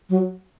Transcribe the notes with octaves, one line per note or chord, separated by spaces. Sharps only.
F#3